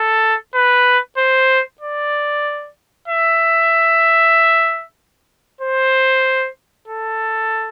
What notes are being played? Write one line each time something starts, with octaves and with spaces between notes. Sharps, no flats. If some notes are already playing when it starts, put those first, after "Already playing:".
Already playing: A4
B4
C5
D5
E5
C5
A4